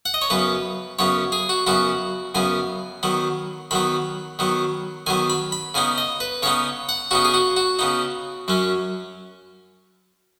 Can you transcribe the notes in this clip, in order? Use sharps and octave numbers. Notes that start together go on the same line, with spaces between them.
F#5
D#5
C#5
F#2 C#3 B3 B4
F#2 C#3 B3 C#5
G#4
F#4
F#2 C#3 B3 F#4
F#2 C#3 B3 G#5
D#3 F#3 B3
D#3 F#3 B3 B5
D#3 F#3 B3
D#3 F#3 B3 G#5
B5
B5
C#3 B3 D#4 G#5
D#5
B4
C#3 B3 D#4 C#5
F#5
C#3 B3 D#4 F#4
G#4
F#4
F#4
C#3 B3 D#4
F#2 F#3 C#4